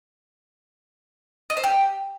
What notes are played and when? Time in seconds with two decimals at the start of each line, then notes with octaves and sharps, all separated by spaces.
1.50 D#5
1.57 C5
1.64 G4